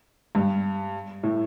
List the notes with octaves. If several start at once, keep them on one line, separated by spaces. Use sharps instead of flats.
G2
A2